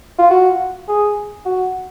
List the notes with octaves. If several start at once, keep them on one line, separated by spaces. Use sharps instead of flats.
F4
F#4
G#4
F#4